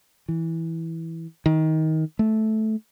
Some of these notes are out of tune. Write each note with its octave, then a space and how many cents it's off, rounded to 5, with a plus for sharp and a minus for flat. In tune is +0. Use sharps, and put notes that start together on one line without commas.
E3 -10
D#3 +20
A3 -10